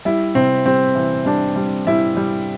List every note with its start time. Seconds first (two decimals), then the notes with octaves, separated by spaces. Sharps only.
0.05 G3 E4
0.35 C3 C4
0.66 G3 C4
0.95 E3
1.25 G3 D4
1.56 G3
1.87 G3 E4
2.17 G3